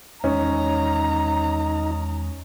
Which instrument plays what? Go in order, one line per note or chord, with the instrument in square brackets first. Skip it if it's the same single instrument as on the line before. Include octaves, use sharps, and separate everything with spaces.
[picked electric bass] E2 D#3 G#3 [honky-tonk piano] C#4 [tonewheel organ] D#4 [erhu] A#5